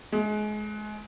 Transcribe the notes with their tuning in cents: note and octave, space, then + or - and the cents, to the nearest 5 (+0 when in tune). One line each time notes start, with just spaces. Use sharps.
G#3 +30